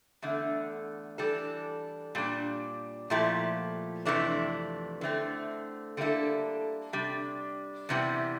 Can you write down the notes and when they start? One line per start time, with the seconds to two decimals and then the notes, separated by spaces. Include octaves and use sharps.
0.22 E2 D3 A3
1.18 E3 G3 D4 A4
2.15 A#2 G3 D4
3.10 A#2 F3 A3 E4 G4
4.05 F2 C3 E3 A3 D4
5.01 D3 A3 C4
5.97 D3 G3 A#3 E4 A4
6.93 C3 G3 D4
7.89 E2 C3 E3 G3